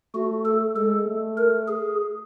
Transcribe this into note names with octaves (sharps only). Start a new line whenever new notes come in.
A3 F#4
A4
G#3 A4
A3
A#4
G#4